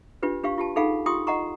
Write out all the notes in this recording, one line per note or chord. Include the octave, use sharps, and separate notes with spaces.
D4 F4 G4 B4
D4 G4 F5 C#6
F4 G4 A5
D#4 G#4 A4 F5 F#5 B5
F4 G4 G5 C6 C#6 D#6
D#5 F#5 A#5 C#6